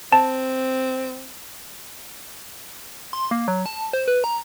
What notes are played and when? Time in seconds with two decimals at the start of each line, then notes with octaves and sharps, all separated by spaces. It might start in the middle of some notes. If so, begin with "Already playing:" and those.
0.12 C4 A5
3.13 C6
3.31 A#3
3.48 F#3
3.66 A5
3.93 C5
4.08 B4
4.24 A#5